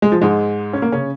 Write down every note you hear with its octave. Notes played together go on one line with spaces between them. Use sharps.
G#3
F3
G#2 G#3
C#4
A#3
C#3 C#4